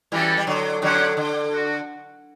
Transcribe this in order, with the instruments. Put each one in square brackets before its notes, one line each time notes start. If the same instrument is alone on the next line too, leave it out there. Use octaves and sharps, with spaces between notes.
[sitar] E3 G3 [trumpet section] C#4 F#4 A4 D5
[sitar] G3
D3 F#3
[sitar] D3 F#3 [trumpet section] C#4 G4 C#5 F#5
[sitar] D3
[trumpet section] F#4